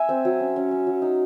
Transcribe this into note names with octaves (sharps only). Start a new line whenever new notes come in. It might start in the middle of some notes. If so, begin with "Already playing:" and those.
Already playing: E5 G#5
C4
F#3
C#4
C#4
C#4
F#3
D#4